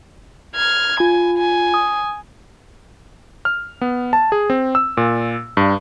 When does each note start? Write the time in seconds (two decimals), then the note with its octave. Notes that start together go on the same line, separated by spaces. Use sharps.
0.55 F6 G#6
1.00 F4 G#5
1.38 G#5
1.74 D#6
3.45 F6
3.81 B3
4.13 A5
4.32 G#4
4.50 C4
4.75 E6
4.97 A#2
5.57 G2